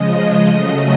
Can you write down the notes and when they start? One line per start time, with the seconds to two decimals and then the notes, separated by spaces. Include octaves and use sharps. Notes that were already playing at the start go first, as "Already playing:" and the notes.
Already playing: C#3 F3 G#3 D#5
0.48 C#3 F#3 A3